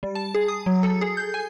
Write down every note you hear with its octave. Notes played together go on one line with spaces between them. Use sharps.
G3
A5
G#4
D#6
F#3
A4
G#4
G6
G#5